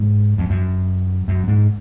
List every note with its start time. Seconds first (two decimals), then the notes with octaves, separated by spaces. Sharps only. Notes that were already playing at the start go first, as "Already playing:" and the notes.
Already playing: G#2
0.38 F2
0.50 F#2
1.28 F#2
1.48 G#2